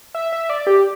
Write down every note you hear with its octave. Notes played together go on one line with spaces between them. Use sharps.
E5
E5
D5
G4